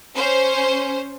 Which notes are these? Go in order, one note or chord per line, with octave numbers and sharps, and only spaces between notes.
C#4 C5